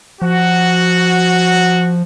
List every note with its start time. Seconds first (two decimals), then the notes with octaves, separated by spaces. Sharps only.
0.22 F3 F#4